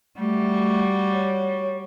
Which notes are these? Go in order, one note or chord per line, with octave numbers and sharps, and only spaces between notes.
G3 A3 F#4
C#5